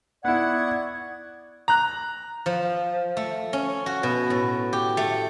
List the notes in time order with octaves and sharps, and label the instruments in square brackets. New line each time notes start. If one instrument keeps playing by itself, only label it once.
[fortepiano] B3 E4 [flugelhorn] D5 [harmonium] F#5 [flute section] C#6 D#6 G#6
[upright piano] A#5 F#6
[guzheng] F3
A3
C#4
F#4
B2
A2
G4
A3